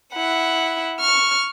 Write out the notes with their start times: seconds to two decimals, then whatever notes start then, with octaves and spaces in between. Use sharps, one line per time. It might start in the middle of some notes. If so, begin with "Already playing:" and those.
0.14 E4 F#5
1.00 C#6 F6